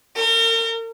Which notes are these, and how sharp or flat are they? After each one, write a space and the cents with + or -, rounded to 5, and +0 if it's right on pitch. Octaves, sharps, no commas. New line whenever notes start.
A#4 -40